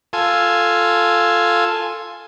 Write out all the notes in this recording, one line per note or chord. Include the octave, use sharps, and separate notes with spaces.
F4 A4 G#5